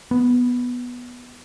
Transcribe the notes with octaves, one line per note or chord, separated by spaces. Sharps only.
B3